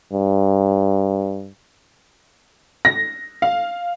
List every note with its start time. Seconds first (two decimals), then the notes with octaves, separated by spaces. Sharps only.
0.13 G2
2.85 A#6
3.42 F5